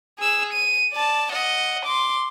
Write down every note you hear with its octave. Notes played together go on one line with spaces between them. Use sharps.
G#4 E6
D#7
D5 A5
D#5 F#5
C6 D6